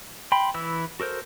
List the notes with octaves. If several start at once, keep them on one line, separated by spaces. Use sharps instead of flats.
G5 B5 C6
E3 E4 E6
F#4 A4 A#4 C5